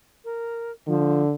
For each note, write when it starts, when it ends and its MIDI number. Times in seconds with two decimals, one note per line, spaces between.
0.25 0.71 70
0.87 1.34 50
0.87 1.21 53